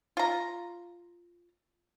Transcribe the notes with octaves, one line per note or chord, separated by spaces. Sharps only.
F4 A#5